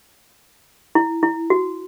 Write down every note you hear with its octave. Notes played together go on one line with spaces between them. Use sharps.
E4
E4
F#4